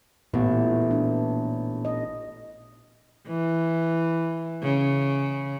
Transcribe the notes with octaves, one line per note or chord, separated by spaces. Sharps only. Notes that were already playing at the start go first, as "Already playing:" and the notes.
A1 A#2 B3
D4
D#5
E3
C#3